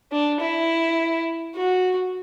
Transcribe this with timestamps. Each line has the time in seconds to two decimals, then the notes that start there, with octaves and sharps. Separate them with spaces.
0.12 D4
0.40 E4
1.55 F#4